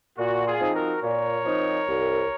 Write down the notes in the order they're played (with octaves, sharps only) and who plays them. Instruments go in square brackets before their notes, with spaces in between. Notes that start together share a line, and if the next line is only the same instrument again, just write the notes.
[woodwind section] A#2 [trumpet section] F#4
[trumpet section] F4 G#4
[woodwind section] F3 C4 D#4
[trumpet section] F#4 A#4
[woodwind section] A#2 [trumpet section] A#4 C#5
[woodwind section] F3 C4 D#4
C2